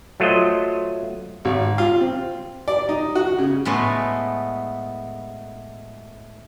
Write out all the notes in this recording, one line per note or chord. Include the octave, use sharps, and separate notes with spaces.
F#3 A3 F4 C5 D#5
G#1
F4
C4
D5
D#4
F#4
C#3
A2 G#3 A3 B3